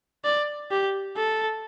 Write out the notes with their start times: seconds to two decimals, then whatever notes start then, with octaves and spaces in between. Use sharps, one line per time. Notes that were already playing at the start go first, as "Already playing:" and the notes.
0.25 D5
0.71 G4
1.17 A4